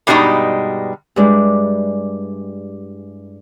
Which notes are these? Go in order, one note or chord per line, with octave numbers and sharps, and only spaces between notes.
G2 B2 G3 G#3 D#4
G2 G#3 D4 E4